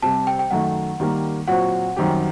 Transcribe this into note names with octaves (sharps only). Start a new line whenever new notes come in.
C3 G3 C4 G4 A5
G5
G5
F#2 D#3 A3 F#5
D#3 G3 A#3
A#2 F#3 C4 F#4 F#5
F#2 D#3 G3 C4 G4